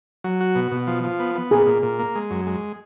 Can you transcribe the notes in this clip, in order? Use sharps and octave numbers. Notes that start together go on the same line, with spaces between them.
F#3
F#4
B2
B2
F3
F3
B3
B3
A#2 G#4
A#2
A#2
A#3
G#3
F#2
G#3